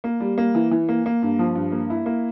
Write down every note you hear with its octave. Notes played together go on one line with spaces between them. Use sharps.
A#3
G3
A#3
E3
E3
A#3
A#3
G2
F3
G2
A#3
E4
A#3